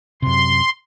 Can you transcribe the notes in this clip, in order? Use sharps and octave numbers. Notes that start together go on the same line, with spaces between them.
F#2 C3 C6